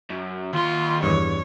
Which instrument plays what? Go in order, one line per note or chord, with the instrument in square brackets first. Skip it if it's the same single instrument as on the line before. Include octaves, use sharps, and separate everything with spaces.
[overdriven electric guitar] F#2
[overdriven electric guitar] D#2 C6 [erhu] F4
[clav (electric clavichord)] E2 G2 [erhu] C#5